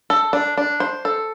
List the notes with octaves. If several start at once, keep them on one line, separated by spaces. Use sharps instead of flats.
A4
D4
D4
C5
A4